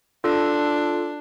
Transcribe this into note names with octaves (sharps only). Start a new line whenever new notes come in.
D4 F4 A4